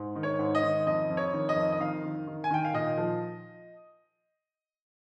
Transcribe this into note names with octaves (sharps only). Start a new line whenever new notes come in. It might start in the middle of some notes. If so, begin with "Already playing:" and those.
Already playing: G#2
D#3
C#5
G#2
D#5
D#3
F2 D#5
F2
C#5
D#3
D#5
F2
D#5
D#3 F5
D#3
D#3
G#5
D#3 G5
F5
A#2 D#5
F3